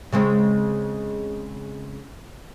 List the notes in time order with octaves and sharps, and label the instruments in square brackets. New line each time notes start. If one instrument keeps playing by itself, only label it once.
[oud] C#3 G#3 C4